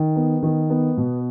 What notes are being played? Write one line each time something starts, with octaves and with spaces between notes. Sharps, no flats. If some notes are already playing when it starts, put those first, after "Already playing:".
Already playing: D#3
B3
D#3
B3
B2